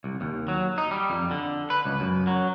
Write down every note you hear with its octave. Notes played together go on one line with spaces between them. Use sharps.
C2
D#2
F#3
D#4
G3
F2
D3
B4
C#2
F#2
F#3